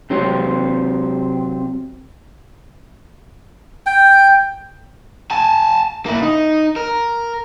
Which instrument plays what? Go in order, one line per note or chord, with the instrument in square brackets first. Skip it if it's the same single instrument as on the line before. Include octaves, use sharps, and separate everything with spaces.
[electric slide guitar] C3 F#3 C4
[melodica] G5
[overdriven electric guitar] G#5 A5
A#3 E4
D#4
A#4